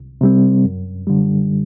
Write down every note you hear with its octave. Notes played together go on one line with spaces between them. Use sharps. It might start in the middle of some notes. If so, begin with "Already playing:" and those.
Already playing: C2
C3 G3 C4
F#2
D3 G3